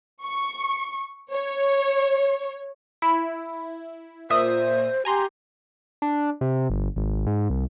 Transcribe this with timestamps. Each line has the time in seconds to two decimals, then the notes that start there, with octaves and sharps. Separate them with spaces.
0.24 C#6
1.32 C#5
3.02 E4
4.30 A#2 C5 E5 D#6
5.05 G4 G#5 A#5 C6
6.02 D4
6.41 C3
6.70 G1
6.96 G#1
7.27 G#2
7.50 C2